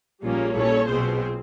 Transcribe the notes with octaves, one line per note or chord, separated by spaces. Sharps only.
A#1 A#2 G3 A#3 C#4 F4 G#4
A#1 A#2 C#4 E4 A4 C#5
B1 B2 C4 F4 G#4 C5